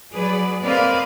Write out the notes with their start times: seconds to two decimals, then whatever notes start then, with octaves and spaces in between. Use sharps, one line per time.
0.14 F#3 G#4 B4 D5
0.61 A#3 C4 B4 D5 D#5 F5